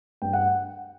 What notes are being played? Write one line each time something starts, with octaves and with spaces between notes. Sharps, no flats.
G2 G5
F#5